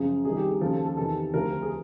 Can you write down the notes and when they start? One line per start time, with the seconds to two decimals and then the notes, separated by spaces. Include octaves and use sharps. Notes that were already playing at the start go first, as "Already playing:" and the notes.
Already playing: F#2 C#3 F3 G#4
0.25 C2 C3 D#3 G#4
0.37 G4
0.49 G#4
0.61 D#2 C#3 F3 A4
0.74 A4
0.85 A4
0.97 E2 C3 D#3 A4
1.33 D2 C3 F3 A#4
1.62 G#4